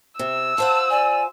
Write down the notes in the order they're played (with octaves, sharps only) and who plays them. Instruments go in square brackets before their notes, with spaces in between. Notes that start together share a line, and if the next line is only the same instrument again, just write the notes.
[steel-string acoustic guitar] C3 [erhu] E6
[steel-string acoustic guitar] F4 C5 F#5 [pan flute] A5
[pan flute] D5 [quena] G#5